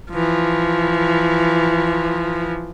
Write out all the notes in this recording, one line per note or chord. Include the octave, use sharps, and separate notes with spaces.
E3 F3